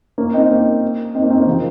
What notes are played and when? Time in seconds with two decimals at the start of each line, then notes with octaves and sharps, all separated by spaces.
0.18 A#3 C#4
0.34 C4 D#4
0.50 A#3 C#4
1.15 C4 D#4
1.22 A#3 C#4
1.30 C4 D#4
1.39 A#3 C#4
1.47 C#3 F3